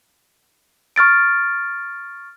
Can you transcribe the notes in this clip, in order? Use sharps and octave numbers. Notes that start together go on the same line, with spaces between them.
C#6 F6 A6 D7